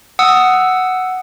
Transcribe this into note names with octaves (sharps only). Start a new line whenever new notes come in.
F#5 D#6 E6